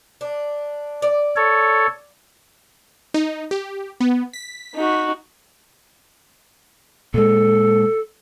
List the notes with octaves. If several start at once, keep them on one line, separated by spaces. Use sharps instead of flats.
D4
D5
A4 C#5
D#4
G4
B3
B6
D#4 F#4
A#2 G#3 A4